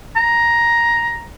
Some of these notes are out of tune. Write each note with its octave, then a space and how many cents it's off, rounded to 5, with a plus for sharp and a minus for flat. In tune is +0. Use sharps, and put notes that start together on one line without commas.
A#5 +10